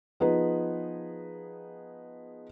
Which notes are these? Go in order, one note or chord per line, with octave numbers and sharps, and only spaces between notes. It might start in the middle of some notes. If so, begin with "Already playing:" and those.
F3 B3 D#4 G#4 B4